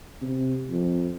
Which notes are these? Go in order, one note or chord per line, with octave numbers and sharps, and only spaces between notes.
C3
F2